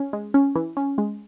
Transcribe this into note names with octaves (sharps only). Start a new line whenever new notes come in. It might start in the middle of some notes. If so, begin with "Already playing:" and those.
Already playing: C#4
G#3
C#4
E3
C#4
G#3